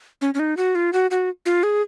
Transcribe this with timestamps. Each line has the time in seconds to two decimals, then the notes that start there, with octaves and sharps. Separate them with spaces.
0.21 C#4
0.34 C#4
0.39 D#4
0.57 F#4
0.75 F4
0.93 F#4
1.11 F#4
1.46 F4
1.63 G#4